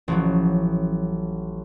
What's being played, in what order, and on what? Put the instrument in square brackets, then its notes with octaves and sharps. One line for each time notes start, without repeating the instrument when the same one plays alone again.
[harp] A1 F3 F#3